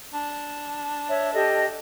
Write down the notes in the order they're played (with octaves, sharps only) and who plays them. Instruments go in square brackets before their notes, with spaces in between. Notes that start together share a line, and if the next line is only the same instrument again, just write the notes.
[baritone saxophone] D4
[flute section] C#5 E5
G4 A4 D#5